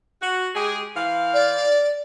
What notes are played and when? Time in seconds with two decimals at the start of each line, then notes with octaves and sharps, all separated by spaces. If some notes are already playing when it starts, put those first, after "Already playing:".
0.21 F#4
0.54 G#3 G4 G#4
0.96 E3 C5 F5
1.34 D5